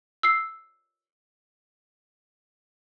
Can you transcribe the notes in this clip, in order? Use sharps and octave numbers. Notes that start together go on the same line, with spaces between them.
E6 C7